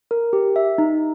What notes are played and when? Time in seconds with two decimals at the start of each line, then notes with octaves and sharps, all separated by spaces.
0.11 A#4
0.33 G4
0.56 E5
0.78 D#4